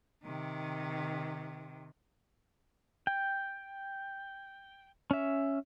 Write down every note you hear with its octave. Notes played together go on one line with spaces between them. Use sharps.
C3 D#3
G5
C#4 E5